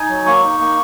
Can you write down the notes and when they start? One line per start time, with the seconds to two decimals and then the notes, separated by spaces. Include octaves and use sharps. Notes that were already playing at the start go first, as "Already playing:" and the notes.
Already playing: D#4 G#5
0.09 F#3
0.26 A#3 C#6
0.43 D#4
0.60 A#3